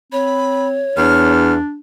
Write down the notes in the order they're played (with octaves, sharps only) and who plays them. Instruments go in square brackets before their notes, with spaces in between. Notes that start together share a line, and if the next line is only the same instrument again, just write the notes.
[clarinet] C4 [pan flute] C#5 [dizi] B5
[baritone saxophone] E2 [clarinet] D4 [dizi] F6